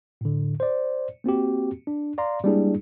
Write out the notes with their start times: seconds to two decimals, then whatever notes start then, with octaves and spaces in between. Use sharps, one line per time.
0.21 A2 D3
0.60 C5 D5
1.24 A#3 C4 F#4 G4
1.87 D4
2.18 D5 F5 A#5 C6
2.44 G3 G#3 A#3 D4 E4 G#4